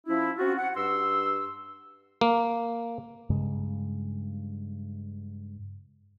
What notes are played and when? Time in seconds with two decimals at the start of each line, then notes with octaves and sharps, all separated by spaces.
0.06 F3 C#4 E4
0.38 C4 C#4 F4 F#4
0.58 F#5
0.75 G2 C6 E6
2.21 A#3
3.30 G2 C#3 G#3